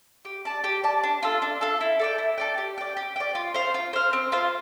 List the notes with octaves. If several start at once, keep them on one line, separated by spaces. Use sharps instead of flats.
G4
D5 A5
G4
D5 A5
D4
F4 A4
D4
F4 A4
E4
A4 D5 G5
E4
A4 D5 G5
G4
D5 G5
G4
D5 G5
F4
C5 F5
F4
C5 F5
C4
F4 C5 F5